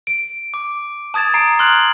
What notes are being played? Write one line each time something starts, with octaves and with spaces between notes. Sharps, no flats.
D7
D6
A5 D#6 G#6 A6 E7
A#5 C7 D7
C6 F6 F#6 G#6 F#7